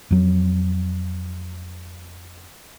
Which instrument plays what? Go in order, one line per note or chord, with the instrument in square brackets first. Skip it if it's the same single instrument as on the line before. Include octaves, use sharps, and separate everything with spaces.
[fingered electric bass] F2 F#3